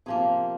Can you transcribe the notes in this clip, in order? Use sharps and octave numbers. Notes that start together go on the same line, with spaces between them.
C3 F3 A#3 G#4